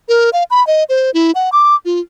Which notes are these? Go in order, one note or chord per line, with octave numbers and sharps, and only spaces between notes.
A#4
F5
B5
D#5
C5
E4
F#5
D6
F4